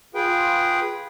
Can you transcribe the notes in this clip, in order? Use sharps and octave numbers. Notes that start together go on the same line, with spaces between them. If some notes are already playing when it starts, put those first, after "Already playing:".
F4 G#4 B4 G5